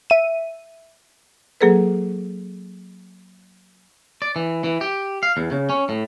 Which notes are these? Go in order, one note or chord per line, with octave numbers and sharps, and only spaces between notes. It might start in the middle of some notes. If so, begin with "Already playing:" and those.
E5 D#7
F#3 A#3 G#4 A4 B4
D5
E3
E3
G4
F5
E2
C#3
C#4
A2